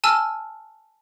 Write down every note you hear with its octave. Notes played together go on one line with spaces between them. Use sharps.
G#5 A5 E6 F6